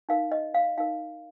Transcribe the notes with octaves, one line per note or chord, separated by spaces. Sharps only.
D#4 A#4 F5
D#5
F5
D#4 A#4 F5